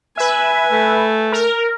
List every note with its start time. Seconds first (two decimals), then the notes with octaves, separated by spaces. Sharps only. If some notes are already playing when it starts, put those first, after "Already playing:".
0.17 B4 E5 G#5
0.71 A3
1.32 A#4